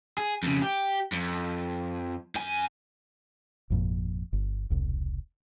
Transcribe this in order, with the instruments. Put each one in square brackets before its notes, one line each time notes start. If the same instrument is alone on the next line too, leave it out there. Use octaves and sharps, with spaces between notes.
[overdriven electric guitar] G#4
F2 C#3
G4
F2
F#2 G#5
[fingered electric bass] G#1 F2 A#2
G1
E1 C2